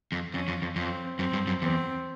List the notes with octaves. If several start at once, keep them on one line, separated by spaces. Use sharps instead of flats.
F2
F2 C#4
F2
F2
F2 C4
F#2 C4
G2
F#2
E2 C4